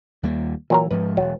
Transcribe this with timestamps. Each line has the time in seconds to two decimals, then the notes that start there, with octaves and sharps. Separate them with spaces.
0.23 D#2 G3 A#3
0.70 A#2 E3 F#3 A#4
0.91 G#2 F3 G#3 B4
1.17 E1 F#3